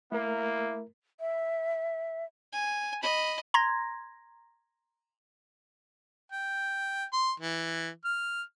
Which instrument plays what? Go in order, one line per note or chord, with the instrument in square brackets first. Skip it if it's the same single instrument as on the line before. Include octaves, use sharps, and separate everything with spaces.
[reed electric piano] A3 A#4 [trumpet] A#3 [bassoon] E4
[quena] E5
[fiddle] G#5
D#5 B5
[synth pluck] A#5 C6 G#6 A#6
[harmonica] G5
C6
E3
F6